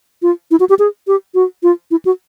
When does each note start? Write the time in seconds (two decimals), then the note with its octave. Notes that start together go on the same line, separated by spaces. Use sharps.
0.22 F4
0.51 E4
0.60 F#4
0.69 G4
0.79 G#4
1.07 G4
1.34 F#4
1.63 F4
1.91 E4
2.05 F#4